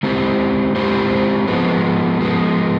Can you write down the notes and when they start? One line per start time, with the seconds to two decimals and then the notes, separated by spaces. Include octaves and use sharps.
0.03 G#3 C4 E4 G4 C5
0.75 G#3 C4 E4 G4 C5
1.48 F3 G#3 B3
2.20 F3 G#3 B3